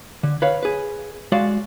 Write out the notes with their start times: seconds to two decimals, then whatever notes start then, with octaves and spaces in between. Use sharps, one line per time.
0.23 D3
0.42 B4 C#5 F5
0.63 G#4 B4
1.32 G#3 F#4 D5 F5 C6